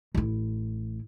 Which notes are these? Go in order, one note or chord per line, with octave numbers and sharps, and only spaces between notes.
A1 E4